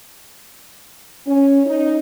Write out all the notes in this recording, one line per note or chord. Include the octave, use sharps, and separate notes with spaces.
C#4
D#4